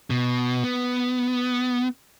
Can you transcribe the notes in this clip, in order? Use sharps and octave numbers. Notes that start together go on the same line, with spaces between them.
B2
B3